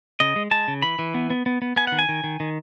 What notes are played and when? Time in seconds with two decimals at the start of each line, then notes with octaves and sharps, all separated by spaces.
0.20 C#3 D#5
0.36 G#3
0.51 G#3 A5
0.68 C#3
0.82 E3 B5
0.99 E3
1.14 B3
1.30 B3
1.46 B3
1.62 B3
1.76 B3 G#5
1.87 D#3 F#5
1.99 G#5
2.09 D#3
2.24 D#3
2.40 D#3